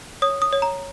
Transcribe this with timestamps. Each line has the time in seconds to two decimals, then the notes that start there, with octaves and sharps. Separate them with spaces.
0.22 C#5 D#6
0.42 D#6
0.53 C#5
0.62 A#5